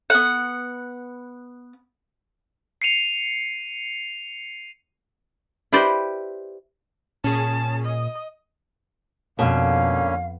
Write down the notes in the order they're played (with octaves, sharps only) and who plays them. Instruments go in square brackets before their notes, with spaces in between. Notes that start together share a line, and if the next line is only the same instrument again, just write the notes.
[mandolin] B3 F#5
[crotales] C7 C#7 D#7 F7
[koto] E4 G4 B4 C5 D5 D#5
[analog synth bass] A#2 [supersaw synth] C#4 G#4 [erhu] A5
[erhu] D#5
[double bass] F2 [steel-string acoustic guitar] B2 [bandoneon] D3 A#3 C#4 [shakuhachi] F5